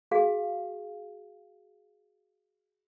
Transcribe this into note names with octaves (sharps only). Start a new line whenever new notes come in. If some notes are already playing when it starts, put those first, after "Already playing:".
F#4 G#4 F5